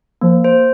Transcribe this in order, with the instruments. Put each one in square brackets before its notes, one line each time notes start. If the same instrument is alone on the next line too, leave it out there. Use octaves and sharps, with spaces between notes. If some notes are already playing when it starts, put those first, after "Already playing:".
[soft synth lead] F3 [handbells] A#3
[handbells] C5